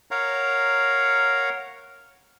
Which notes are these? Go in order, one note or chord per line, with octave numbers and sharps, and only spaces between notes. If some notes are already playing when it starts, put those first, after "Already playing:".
A#4 C#5 F5 F#5 A#5